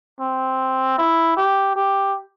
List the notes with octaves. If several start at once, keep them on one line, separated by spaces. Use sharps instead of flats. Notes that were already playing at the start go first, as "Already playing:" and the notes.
C4
E4
G4
G4